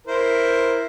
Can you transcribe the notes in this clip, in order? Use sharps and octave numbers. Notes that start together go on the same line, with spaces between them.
E4 A#4 C5